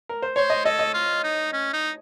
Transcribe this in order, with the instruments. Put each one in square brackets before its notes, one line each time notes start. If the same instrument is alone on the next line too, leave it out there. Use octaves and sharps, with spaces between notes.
[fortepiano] A#4
C5
[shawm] C5 [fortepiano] C#5
[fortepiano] D#5
[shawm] A4 [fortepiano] D#5
[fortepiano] D#5
[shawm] F4
D#4
C#4
D#4